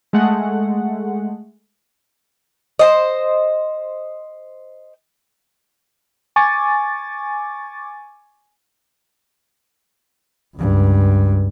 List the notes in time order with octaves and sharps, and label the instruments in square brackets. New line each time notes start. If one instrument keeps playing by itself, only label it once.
[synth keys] G#3 A3 F#5
[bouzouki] C5 D#5
[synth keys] G#5 C#6 D6 A6
[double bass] C#2 G2